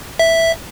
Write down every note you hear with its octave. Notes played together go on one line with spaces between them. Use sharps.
E5